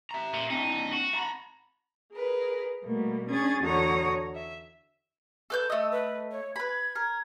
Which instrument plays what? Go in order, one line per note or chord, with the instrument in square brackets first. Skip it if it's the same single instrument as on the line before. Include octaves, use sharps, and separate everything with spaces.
[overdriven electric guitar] E5 A#5
[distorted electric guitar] A#2
[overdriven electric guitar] C4 D4 [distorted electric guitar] D#4
[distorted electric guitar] F#4
[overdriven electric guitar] A#5 B5
[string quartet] G#4 A#4 B4
B2 G3 A3 A#3
C#4 D4 G#4 G#6 A6
E2 D3 F#4 C#5 A#5 D#6
E5
[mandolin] A4 B4 G6
[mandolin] A3 D#5 [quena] E6
[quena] B4
C#5
[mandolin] B4 B5 [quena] G#6
[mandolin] A#4